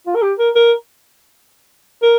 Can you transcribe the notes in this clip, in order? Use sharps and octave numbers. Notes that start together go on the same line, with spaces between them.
F4
A#4
G4
A#4
A#4
A#4